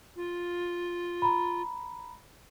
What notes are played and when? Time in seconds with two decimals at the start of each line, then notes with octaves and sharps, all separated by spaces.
0.16 F4
1.22 A#5 B5